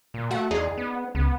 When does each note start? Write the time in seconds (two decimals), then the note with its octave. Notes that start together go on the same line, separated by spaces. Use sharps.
0.14 A#2
0.31 A3 F#4 F5 F#5
0.51 E2 D#4 G#4 D5
0.77 B3
1.15 C#2 B3